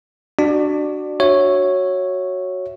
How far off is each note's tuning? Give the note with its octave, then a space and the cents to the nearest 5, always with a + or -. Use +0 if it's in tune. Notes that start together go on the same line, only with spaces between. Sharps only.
D4 +15 F#4 +10 D5 +25
F#4 +0 C#5 -5 E5 +0